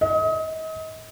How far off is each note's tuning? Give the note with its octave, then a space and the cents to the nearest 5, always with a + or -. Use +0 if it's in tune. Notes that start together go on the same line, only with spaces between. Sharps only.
D#5 +35